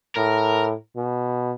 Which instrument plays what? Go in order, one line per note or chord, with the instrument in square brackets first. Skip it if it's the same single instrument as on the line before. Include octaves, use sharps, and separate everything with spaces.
[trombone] A2 [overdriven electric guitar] A#4
[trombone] B2